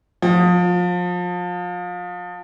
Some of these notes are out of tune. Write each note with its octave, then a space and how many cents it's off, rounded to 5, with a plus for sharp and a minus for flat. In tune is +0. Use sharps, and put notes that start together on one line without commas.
F3 +30